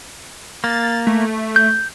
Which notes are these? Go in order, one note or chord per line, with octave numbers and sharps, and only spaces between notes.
A#3 A6
A3
G6